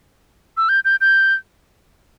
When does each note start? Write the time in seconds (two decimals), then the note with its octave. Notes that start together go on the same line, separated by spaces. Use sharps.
0.57 E6
0.69 G6
0.85 G6
1.01 G6